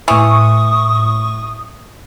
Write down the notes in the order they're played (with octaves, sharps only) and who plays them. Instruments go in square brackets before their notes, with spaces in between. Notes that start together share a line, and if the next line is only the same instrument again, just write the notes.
[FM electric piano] A2 C#6 [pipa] E3 [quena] D#6